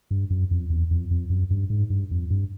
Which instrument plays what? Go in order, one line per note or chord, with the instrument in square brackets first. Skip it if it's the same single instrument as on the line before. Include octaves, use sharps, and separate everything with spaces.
[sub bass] G2
F#2
F2
E2
F2
F2
F#2
G2
G#2
G2
F2
G2